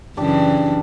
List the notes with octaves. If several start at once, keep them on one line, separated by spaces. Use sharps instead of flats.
F#2 C#3 E3 D4 G4